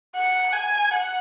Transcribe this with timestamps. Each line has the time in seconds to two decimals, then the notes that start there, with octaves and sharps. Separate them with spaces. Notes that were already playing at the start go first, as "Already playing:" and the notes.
0.15 F#5
0.53 G#5
0.91 F#5